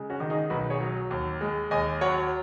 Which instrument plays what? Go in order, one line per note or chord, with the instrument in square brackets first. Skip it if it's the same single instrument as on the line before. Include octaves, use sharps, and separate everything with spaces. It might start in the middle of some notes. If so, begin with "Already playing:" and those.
Already playing: [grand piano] C#3 G#3
C#4 F#4
D#3
D#4 G#4
B1 F#4 B4
G#4 C#5
F#3
D#2
G#3
D#2 D#5 G#5
F#3 C#5 F#5